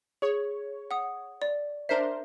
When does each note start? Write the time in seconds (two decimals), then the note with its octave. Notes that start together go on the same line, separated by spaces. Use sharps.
0.22 G#4 C#5
0.91 F#5 D#6
1.42 D5
1.89 D4 A#4 C5 E5